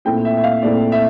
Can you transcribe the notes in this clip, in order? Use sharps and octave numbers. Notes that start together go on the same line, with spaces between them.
A#2 A3 C4 E4 G5
E5
E5
F5
A#2 A3 C4 E4 D5
E5